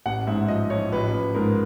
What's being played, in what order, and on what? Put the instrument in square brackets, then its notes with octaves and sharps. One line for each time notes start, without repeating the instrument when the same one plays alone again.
[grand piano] A1 F#5
G#2 E5
F3 D#5
F3 C#5
A1 B4
A1
G#2 A#4